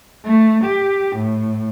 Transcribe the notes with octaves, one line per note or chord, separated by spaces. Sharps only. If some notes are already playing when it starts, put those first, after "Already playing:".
A3
G4
A2